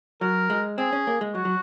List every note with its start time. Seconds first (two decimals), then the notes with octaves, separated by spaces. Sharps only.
0.21 F#3 A#4
0.50 G#3
0.78 C4 G#4
0.93 C#4
1.07 A#3
1.21 G#3
1.35 F#3 F#4
1.45 F#3